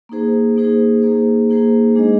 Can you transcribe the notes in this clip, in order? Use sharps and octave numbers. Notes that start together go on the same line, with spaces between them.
A#3 D#4 G#4 C5
A#3 D#4 G#4 C5
A#3 D#4 G#4 C5
A#3 D#4 G#4 C5
G#3 D4 G#4 D#5